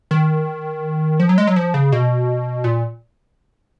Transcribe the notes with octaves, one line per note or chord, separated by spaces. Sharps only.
D#3
F3
F#3
G#3
F#3
F3
C#3
B2
A#2